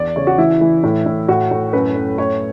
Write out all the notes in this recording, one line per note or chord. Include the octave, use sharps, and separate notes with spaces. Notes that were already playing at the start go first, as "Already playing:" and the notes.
Already playing: E2 D5
C#3 C#5
F#4
E3 E4
E3
A2
A2
A2 F#4
A2
F#2 B4
F#2
A2 C#5